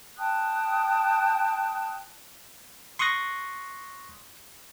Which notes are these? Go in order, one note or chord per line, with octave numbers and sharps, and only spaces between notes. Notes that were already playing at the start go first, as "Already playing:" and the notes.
G5 A5 D#6 F#6
C6 C#6 D#6 F#6 A#6